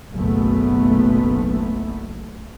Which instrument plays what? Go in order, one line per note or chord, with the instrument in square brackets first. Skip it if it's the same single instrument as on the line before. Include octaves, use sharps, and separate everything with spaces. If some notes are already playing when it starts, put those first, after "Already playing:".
[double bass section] F#1 B1 A3 B3